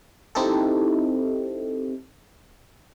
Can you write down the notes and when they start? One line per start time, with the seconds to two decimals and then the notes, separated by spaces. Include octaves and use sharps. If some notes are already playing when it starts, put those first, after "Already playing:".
0.35 C4 D#4 E4 G4 A4